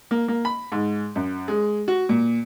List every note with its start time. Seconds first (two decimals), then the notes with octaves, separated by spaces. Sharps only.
0.11 A#3
0.28 A#3
0.45 B5
0.72 G#2
1.16 F#2
1.48 G#3
1.88 F#4
2.09 A#2